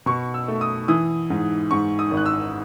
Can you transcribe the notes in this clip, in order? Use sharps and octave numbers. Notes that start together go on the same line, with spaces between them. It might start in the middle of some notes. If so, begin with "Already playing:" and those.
B2 C#6
E6
A3
D#6
E3 D#6
G#2
G#2 C#6
D#6
G#1
F#6
E6